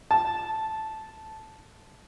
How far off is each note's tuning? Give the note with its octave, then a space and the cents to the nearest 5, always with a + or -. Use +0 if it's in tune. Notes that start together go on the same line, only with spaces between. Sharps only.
A5 -5